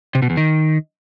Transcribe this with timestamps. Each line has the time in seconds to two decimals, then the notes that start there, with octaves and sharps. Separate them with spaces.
0.15 C3
0.22 B2
0.30 E2
0.37 D#3